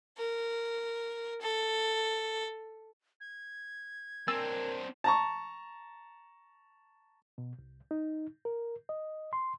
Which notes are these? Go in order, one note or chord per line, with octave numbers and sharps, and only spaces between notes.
A#4
A4
G#6
C4 D4 A#4 G#5 E6 A6
A5 A#5 C#6
B2
C2
D#4
A#4
D#5
C6